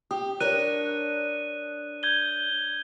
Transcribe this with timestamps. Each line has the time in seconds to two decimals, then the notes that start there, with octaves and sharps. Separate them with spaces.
0.11 G4 D#6
0.40 D4 A#4 C#5 F#6 D#7
2.03 G6 G#6 G7